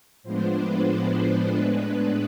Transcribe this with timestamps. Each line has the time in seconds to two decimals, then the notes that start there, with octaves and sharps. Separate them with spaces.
0.23 A2 F3 G#3 B3 D4 C5
0.55 B4
0.87 C5
1.52 A2 G#3 B3 D4 B4